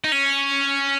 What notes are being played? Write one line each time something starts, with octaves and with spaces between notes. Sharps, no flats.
D#4
C#4